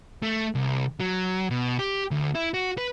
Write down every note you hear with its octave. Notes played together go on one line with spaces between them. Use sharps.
A3
C2
F#3
B2
G4
D2
E4
F#4
B4